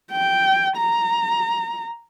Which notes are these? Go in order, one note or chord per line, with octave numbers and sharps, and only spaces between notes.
G5
A#5